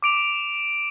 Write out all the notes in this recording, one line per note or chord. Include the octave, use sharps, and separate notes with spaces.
D6 D7 F7